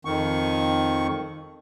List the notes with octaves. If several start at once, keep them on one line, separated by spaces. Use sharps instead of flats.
F2 D#3 C#6